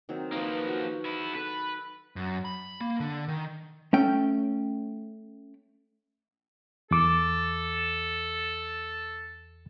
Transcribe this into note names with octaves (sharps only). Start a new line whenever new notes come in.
D#3 F#3 C4
F3 A#3 D#4 B4 C5
F#4
B3 E4
A4 B4
F#2
B5
A#3
D3
D#3
A3 C#4 G5
E2 A4 D6